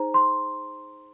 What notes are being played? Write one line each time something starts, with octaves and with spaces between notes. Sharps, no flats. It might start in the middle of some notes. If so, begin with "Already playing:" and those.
Already playing: D#4 G#4 C5 A#5
C6